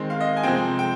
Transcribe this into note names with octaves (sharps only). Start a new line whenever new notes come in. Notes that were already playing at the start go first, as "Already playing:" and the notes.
Already playing: D#3 G#3 C4
F5
D#5
G#5
C3 F3 G#3 C4 G5
G5